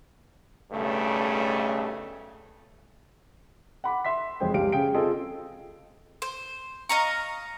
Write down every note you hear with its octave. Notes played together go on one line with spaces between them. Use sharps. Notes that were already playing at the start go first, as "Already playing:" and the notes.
B1 G2 C#3 A3
F#5 B5 D6
E5 C6 B6
F#1 F2 G#3 C5 G5
C#2 G3 F5 D7
C#3 G#4 F5 G5 D7
C4 F4 G#4 A4 D#5
C5
D#5 F5 A#5 C#6